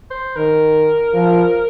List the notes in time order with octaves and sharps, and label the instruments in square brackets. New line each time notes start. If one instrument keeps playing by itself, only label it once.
[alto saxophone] C5
[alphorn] D#3 [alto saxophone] A#4
[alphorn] F3